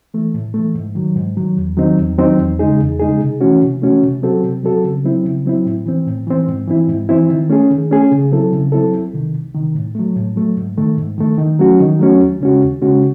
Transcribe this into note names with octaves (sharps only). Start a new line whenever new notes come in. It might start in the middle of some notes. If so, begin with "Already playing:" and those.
E3 A3
A2
E3 A3
G#2
D#3 F#3
G#2
D#3 F#3
E2
D#3 F#3 C4 D#4
E2
D#3 F#3 C4 D#4
E2
C#3 G#3 D#4 G#4
E2
C#3 G#3 D#4 G#4
C3
E3 A3 C#4 F#4
C3
E3 A3 C#4 F#4
C3
F#3 C4 F#4 A4
C3
F#3 C4 F#4 A4
C#3
F#3 C4 E4
C#3
F#3 C4 E4
A2
E3 C4
A2
E3 C4
G#2
E3 C4 E4
G#2
E3 C4 E4
D#3
A3 C#4 G#4
D#3
A3 C#4 G#4
C#3
F#3 C4 E4 A4
C#3
F#3 C4 E4 A4
C2
C3 D#3
C2
C3 D#3
A2
F#3 A3
A2
F#3 A3
G#2
D#3 A3
G#2
D#3 A3
D#3
F#3 A3 C#4 F#4
D#3
F#3 A3 C#4 F#4
D#2
C#3 G#3 C#4 F#4
D#2
C#3 G#3 C#4 F#4